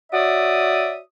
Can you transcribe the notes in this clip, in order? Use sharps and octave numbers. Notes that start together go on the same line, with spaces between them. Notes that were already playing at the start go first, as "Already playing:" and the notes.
F#4 C#5 D5 E5 D#6